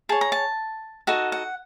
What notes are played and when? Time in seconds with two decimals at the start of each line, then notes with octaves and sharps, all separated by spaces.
0.09 G#4 C#5 A5
0.21 A#5
0.32 A5
1.07 D#4 F#4 A4 F#5
1.32 F#5